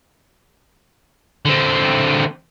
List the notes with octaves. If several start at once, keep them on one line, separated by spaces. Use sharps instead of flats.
D3 C4